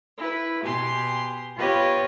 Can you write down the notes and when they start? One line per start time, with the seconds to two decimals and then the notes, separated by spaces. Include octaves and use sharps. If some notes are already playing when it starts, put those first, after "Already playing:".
0.19 E4 B4
0.64 B2 G4 G#4 C6
1.57 B3 F4 G4 B4 C#5 D#5